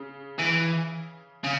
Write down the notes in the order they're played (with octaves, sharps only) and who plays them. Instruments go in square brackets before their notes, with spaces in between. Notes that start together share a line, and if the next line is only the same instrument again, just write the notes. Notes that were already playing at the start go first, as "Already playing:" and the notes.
Already playing: [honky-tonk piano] C#3
[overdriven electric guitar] E3
C#3